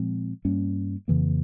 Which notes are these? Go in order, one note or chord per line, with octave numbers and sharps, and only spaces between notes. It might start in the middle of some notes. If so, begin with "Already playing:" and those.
Already playing: A#2 F3 G#3 C4
G2 G3 A#3 C#4
F2 C#3 E3 A#3